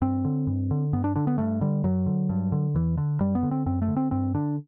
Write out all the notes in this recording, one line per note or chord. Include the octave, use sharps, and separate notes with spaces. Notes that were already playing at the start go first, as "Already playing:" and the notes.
G2 C4
D3
G2
D3
G2 B3
D4
D3 D4
B3
G2 A3
D3 G3
F#2 F#3
D3
G2
D3
E2 E3
D3
F#2 G3
B3
D3
C4
F#2 C4
A3
D3
C4
G2 C4
D3 D4